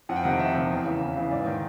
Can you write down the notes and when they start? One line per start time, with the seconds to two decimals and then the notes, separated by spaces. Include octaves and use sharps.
0.09 F2 F#5
0.16 G5
0.23 C3 D#3 F#5
0.39 F2 E5
0.55 C3 D#3
0.70 E2
0.86 C#3 E3
1.01 E2
1.16 C#3 E3
1.31 G#2 D5
1.46 D#3